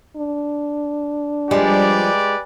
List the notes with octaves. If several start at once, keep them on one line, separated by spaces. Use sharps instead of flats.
D4
F3 G3 G#3 G4 B4 D5